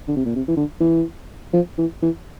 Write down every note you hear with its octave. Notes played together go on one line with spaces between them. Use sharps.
D3
C3
A#2
C3
E3
D3
E3
F3
E3
E3